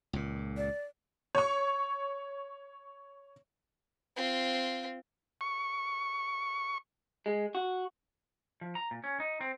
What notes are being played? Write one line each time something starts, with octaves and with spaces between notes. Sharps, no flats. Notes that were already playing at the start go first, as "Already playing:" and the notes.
C#2 A#2
D5
C#5 C#6
C4 F4
C#6
G#3
F#4
F3
A#5
A#2
C#4
D#4
C4